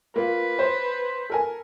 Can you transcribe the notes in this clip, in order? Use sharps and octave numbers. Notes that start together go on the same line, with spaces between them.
A#3 F4 B4
C5 C#5
A4 A#4 G#5